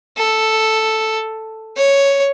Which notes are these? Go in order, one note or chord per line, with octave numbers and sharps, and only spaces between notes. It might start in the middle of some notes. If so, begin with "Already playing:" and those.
A4
C#5